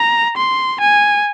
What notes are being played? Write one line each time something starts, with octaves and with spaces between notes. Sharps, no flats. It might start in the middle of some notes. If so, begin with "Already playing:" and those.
Already playing: A#5
C6
G#5